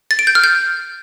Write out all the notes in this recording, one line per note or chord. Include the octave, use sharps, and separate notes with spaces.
A6
D7
G6
F6
G6